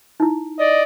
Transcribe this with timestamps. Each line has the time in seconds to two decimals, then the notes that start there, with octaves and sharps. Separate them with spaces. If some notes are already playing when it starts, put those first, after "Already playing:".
0.20 D#4 E4
0.59 D5 D#5